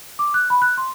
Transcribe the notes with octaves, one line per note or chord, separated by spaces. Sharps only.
D6
F#6
B5
F#6
C6